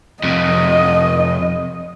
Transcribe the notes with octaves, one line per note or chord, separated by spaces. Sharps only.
F2 C3 D#5